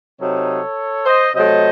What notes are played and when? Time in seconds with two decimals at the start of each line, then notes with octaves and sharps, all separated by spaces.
0.20 C3 F#3 C4 D#4 A4 C#5
1.06 C5 D#5
1.34 C3 F#3 A3 C5 D#5